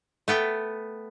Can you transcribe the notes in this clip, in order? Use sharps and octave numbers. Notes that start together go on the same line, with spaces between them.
A3 B3 G5